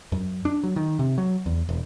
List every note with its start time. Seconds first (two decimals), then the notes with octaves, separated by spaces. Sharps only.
0.12 F#2
0.45 D4
0.64 F#3
0.76 D#3
0.99 C3
1.18 F#3
1.46 E2
1.69 E1